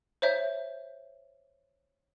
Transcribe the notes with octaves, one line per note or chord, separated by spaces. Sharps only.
C5 C#5 E5 G6